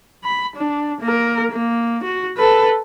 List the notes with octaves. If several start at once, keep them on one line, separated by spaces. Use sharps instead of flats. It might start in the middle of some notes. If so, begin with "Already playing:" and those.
B5
D4
A#3 A#4
A#3
F#4
A4 B4